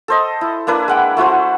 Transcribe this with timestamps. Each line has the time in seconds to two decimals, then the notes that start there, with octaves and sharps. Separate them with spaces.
0.08 A4 C5 D#5
0.41 E4
0.67 A#3 D4 E4 B4
0.88 G#3 F#5 G5
1.17 A3 E4 F#4 C5